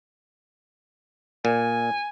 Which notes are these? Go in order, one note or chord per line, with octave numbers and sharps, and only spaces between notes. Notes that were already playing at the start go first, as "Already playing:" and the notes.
A#2 G#5